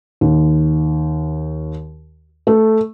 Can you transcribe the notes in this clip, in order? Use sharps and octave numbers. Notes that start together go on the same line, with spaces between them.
D#2
A3